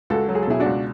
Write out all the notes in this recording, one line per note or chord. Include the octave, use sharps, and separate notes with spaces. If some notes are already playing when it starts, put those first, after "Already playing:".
C#2 F#4 A4
F#3
G#4
A4
B2 E4 G#4
D4 F#4
C#2